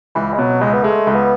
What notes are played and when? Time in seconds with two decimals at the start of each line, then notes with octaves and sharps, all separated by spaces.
0.15 C#2 E3
0.33 G#3
0.38 B2 F#3
0.61 C#2 G#3
0.73 B3
0.84 G#3 A3
1.07 C#2
1.15 B3